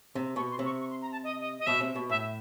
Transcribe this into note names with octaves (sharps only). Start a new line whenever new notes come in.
C3
B2 C#6
C6
C3
C#6
C#6
C6
A#5
A5
D#5
D#5
D#5
B2 E5
C3
B2
A2 E5